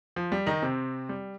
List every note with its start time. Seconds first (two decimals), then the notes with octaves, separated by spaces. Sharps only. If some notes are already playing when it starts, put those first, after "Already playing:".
0.16 F3
0.32 G3
0.47 D#3 D#4
0.62 C3 C4
1.09 G3